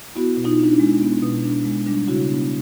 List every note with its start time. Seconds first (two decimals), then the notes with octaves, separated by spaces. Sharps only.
0.15 B3 E4 F#4
0.37 B2
0.44 D#4 F4
0.59 D4 D#4
0.72 D4 E4
0.80 G#3
1.02 B3
1.22 B2
1.44 D4
1.65 G#3
1.86 G3 D4
2.08 C#3 E4 F#4
2.29 B3 D4